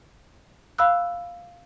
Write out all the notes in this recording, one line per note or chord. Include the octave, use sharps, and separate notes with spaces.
F5 B5 E6 F#6